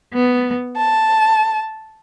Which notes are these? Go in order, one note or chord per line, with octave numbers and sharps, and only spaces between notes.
B3
A5